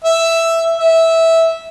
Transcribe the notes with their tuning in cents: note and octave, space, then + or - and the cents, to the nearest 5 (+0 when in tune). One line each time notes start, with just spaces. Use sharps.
E5 +5
E5 -10